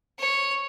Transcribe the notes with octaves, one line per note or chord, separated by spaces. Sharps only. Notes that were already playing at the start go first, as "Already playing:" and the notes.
C#5